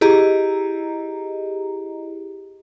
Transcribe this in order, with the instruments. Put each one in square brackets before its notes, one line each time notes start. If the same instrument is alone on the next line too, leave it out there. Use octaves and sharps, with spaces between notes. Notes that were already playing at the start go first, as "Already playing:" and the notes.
[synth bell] E4 G4 G#4 D#5 A#5